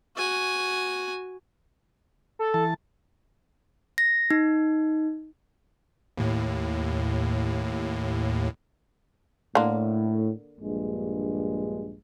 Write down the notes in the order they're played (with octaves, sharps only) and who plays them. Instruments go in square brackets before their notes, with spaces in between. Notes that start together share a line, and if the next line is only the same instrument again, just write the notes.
[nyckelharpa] F#4 G#5
[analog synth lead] A4
[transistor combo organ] E3 A5
[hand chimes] A#6
D#4
[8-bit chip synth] D#2 A2
[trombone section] A2 [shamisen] D3 A#3
[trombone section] A#1 G2 G#3